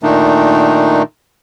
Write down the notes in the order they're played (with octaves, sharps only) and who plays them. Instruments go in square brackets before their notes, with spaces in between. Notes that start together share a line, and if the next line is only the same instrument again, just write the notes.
[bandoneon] A#2 D#3 A3 D4 D#4